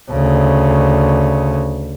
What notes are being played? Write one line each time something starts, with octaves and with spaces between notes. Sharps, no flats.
D2 C#3